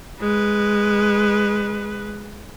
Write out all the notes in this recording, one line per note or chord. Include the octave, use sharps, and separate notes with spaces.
G#3 B4